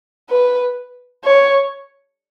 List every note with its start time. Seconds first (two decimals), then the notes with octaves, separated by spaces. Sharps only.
0.30 B4
1.25 C#5